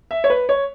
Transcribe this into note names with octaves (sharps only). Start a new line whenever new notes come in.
E5
C#5
B4
C#5